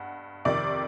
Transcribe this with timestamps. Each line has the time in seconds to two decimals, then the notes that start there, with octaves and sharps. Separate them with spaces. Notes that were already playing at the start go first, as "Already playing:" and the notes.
Already playing: G2 F#5
0.45 F2 C3 D#3 D5